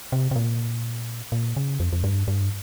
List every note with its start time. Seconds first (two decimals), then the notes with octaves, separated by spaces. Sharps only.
0.12 C3
0.31 C3
0.36 A#2
1.32 A#2
1.56 C#3
1.80 F2
1.92 F2
2.04 G2
2.28 G2